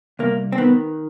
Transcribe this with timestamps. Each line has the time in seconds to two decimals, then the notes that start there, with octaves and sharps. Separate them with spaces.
0.19 C2 A#3
0.52 C4
0.58 D#3 B3